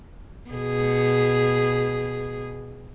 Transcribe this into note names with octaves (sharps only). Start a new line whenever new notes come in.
B2 G#4